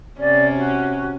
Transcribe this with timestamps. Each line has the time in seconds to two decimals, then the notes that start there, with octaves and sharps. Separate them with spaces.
0.20 C3 C4 C#4 D5
0.57 F#4